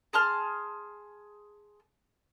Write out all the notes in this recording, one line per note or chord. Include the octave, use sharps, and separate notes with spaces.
G#4 A5 C6 F6